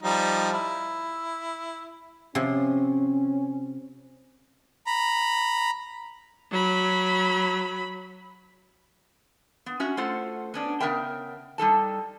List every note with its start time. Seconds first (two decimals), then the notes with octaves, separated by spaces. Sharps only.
0.03 F3 G3 D#4
0.53 E4
2.35 C3 F3 C#4
4.86 A#5 B5
6.51 F#3 B5
9.66 B3
9.80 C#4 F#4 E5
9.97 A3 F4 A4 C5 F#5
10.54 B3 C#4 D4
10.80 C#3 B3 A#4 E5 G5
11.58 G3 D#4 A4 A5